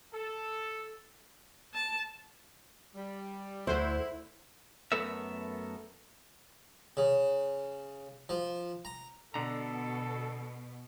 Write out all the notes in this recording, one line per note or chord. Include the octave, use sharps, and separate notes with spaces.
A4
A5
G3
D2 E4 C5
F#2 A3 B3 A4 A#4 E5
C#3
F3
A#5
B2 D3 A4 A#5